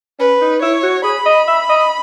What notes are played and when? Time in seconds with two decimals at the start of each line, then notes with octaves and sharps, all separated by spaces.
0.19 C#4 B4
0.41 D#4
0.62 E4 C#5
0.83 F#4
1.04 G#4 B5
1.26 D#5
1.48 E5
1.70 D#5